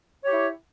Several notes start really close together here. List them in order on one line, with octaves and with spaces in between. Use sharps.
C#5 G4 E4